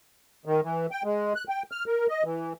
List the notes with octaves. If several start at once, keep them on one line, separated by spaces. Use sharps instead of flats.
D#3
E3
G5
G#3
F#6
G5
F6
A#4
D#5
E3